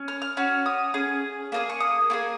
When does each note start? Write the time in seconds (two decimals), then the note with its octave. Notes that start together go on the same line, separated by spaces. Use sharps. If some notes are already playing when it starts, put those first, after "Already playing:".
Already playing: C#4
0.08 F6
0.22 F6
0.37 C#4 F#4
0.66 D#6
0.94 C#4 G#4
1.52 A#3 D#4 G#4
1.70 C#6
1.80 D#6
2.10 A#3 F4 G#4